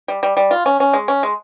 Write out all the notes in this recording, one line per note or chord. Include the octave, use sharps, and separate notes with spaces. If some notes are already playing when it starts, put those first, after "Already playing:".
G3
G3
G3
F4
C#4
C#4
G#3
C#4
G#3